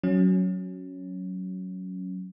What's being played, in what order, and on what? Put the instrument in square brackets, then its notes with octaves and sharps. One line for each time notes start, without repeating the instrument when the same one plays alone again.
[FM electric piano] F#3 C#4